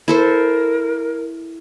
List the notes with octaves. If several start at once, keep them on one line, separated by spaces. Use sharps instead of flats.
E4 A4 A#4 C5